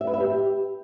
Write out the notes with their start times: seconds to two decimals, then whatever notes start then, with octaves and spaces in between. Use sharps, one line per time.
0.01 E5
0.07 B4
0.14 E5
0.20 G4